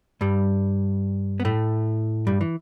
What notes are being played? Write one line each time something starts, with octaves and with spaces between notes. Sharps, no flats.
G2 G3
B3
A2 A3
G2 G3
E3